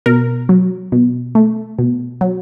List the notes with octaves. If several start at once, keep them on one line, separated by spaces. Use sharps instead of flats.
B2 A#4
F#3
B2
A3
B2
F#3